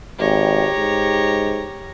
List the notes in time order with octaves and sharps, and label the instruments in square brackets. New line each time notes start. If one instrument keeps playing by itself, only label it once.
[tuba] G#1 [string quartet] G4 C#5 A#5
[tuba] G#2